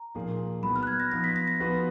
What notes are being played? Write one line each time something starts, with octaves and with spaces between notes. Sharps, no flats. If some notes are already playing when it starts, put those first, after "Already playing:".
Already playing: A#5
A#2 F3 A#3 D#4 G#4
F#3 B3 D#4 B5
F6
F#6
G#6
A#6
F3 B3 D#4 A#6
B6
A#6
A#6
F3 B3 D#4 F#4 B4